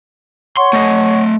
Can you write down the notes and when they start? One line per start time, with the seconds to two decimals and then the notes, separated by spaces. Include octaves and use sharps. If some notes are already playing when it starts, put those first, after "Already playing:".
0.57 C#5 F#5 C6 C#6
0.73 A3 D#5